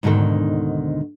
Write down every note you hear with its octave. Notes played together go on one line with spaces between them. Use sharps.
D2 G#2 B2 D3 D#3